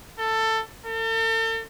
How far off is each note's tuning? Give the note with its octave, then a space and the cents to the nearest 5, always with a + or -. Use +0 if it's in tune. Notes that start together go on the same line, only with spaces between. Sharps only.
A4 +15
A4 +40